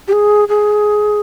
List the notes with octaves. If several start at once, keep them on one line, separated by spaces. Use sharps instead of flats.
G4
G#4
G#4